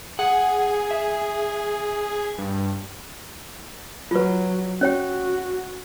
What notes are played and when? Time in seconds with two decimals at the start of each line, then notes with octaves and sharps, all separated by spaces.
0.19 G#4 F#5
0.91 E5
2.38 G2
4.11 F#3 F4 B4
4.81 C#4 F#4 C#5 G5